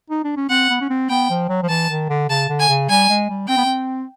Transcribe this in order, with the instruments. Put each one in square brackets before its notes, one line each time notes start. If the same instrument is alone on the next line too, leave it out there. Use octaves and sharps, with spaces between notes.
[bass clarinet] D#4
D4
C#4
[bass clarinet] C4 [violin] F#5
[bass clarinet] B3
C#4
C4
[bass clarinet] B3 [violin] G5
[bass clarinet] F3
F#3
F3
[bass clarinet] E3 [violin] A5
[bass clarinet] D#3
D3
[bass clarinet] C#3 [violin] A5
[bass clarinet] D3
[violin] G#5
[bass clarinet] C#3
[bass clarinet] G3 [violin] G#5
[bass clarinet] G#3
G3
[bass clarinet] C4 [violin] G5
[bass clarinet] B3
C4